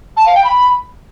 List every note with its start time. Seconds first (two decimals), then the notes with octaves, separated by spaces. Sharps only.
0.17 A5
0.26 F5
0.35 G5
0.44 B5